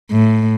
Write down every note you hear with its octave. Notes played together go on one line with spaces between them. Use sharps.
A2